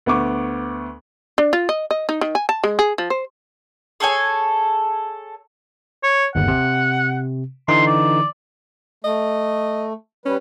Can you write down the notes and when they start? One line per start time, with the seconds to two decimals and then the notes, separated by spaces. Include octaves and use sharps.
0.06 D2 B3 C#6 D6
1.38 D4
1.53 F4
1.69 D#5
1.91 D#5
2.09 D#4
2.21 D#3
2.35 G#5
2.49 A5
2.64 G#3
2.79 G#4
2.98 F3
3.10 C5
4.00 G#4 A4 C#5 G#5
6.03 C#5
6.35 G1 D#2 F#5
6.48 C3
7.68 D3 E3 D#4 C6
7.87 D5
9.04 A3 D#5
10.26 G3 C#4 B4